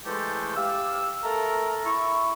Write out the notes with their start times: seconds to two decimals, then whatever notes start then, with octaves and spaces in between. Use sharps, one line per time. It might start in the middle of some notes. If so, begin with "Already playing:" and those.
0.05 E3 G#3 A3 G4 A4 C5
0.57 G4 F5 E6
1.23 A3 A4 A#4 A#5
1.86 E4 C#6